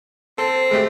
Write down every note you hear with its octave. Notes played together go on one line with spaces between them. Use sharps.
C4 A4
G#3 A3 G4